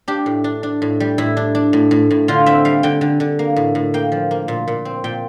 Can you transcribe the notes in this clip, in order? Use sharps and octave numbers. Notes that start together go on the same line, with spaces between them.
D4 G4
A2
D4
D4
A2
G3
A2 E4
D4
D4
A2
A2
A2
D3 F4
C4 E5
G3 F5
D3 G5
D3
D3
A#3
A2
A2
A#3 G5
F3
A#3
A#2
A#2
C4
A#2 G5